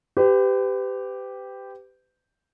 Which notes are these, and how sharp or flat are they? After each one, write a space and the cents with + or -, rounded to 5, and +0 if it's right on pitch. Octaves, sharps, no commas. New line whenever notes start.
G4 +0 B4 +40